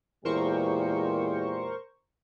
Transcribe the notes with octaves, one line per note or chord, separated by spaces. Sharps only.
E2 A#2 G#3 G4 A#4 C5 C#6